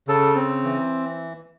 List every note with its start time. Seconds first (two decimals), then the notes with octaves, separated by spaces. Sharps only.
0.08 C#3 A4
0.36 C4
0.64 E3